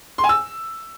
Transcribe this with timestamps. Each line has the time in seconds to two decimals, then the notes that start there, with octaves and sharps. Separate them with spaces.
0.18 C6
0.24 G#5
0.29 E6